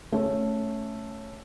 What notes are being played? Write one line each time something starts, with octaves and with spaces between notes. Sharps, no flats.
A3 C#4